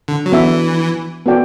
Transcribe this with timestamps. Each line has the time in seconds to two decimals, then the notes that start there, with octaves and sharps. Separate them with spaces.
0.08 D3
0.26 F#3
0.32 E3 B3 D4 F#4 A4 E5
1.26 B3 F#4 A4 D5 G5